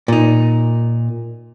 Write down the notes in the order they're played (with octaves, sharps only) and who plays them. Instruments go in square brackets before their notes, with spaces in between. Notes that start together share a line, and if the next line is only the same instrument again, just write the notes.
[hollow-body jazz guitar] A#2 D#4